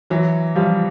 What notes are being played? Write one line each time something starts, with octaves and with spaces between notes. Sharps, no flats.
E3 F#3
F3 G3